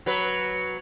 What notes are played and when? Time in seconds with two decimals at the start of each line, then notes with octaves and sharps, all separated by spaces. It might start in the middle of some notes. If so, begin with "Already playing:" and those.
0.06 F#3 B4